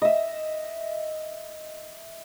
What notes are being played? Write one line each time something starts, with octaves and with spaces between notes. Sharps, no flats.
D#5 E5